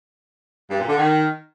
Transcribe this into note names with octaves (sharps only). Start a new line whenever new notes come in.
G2
A#2
D3
D#3